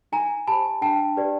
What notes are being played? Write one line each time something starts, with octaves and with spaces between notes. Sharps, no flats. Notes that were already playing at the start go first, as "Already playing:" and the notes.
D#4 G#5 A#5
G4 C5 A5 B5
D4 G5 A5
G4 B4 D5